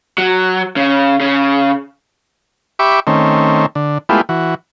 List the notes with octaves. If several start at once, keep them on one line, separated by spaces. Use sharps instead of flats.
F#3
C#3
C#3
G4 E5 B5 C#6 D6
D#3 A3 C4 C#4
D3
G#3 A3 B3 E4 F4 G4
E3 F#4